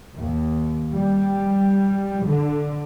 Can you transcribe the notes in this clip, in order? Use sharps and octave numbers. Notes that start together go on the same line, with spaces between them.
D#2
G3
D3